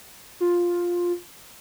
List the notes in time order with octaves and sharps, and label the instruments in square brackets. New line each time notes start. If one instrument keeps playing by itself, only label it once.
[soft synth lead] F4